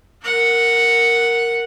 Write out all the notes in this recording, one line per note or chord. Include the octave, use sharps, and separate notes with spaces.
A#4 F#5